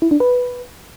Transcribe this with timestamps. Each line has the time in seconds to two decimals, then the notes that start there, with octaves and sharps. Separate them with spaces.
0.02 E4
0.11 D4
0.20 B4